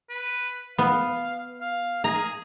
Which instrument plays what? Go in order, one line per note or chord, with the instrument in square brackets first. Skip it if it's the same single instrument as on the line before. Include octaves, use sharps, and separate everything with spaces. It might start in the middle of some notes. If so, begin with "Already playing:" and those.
[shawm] B4
[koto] B3 [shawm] F5
[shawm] F5
[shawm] G#4 [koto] A#5